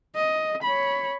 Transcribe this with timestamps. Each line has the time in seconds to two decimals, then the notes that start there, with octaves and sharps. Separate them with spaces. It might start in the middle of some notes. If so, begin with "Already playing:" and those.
0.15 D#5
0.63 C#5 B5